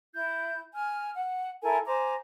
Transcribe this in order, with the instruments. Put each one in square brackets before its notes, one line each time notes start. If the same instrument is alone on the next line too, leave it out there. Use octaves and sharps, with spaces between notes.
[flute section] E4 G6
G#5 F6
F#5
E4 A4 A#4 G#5
C5 G#5 A#5 D6